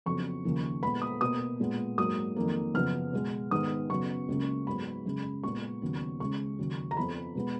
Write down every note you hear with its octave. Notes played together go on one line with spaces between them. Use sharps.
F2 C#3 F#3 B3 C#6
D#2 C#3 F3 A#3
A#2 G#3 B3 B5
D#6
B2 A#3 D#6
A#2 G#3 B3
G#2 F#3 A#3 D#6
F2 D#3 F#3 A#3
F#2 C#3 F3 B3 F6
B2 G#3 B3
G#2 D#3 G#3 B3 D#6
F#2 C#3 F#3 B3 C#6
C#2 C#3 F#3 A#3
G#2 F#3 B3 B5
F#2 C#3 G#3
A#2 G#3 B3 C#6
D#2 C#3 F#3 B3
C#2 C#3 G#3 C#6
D#2 C#3 F#3
A#5
F2 F3 B3 B5
B2 G#3 B3